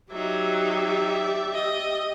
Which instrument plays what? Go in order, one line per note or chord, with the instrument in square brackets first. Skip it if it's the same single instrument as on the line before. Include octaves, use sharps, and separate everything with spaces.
[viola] F#3 D#4 [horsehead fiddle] G4 [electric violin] D5 E5
[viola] D#5